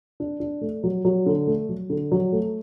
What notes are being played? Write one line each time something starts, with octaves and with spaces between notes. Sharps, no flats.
D4
D4
A3
F#3
F#3
D3
A3
F#3
D3
F#3
A3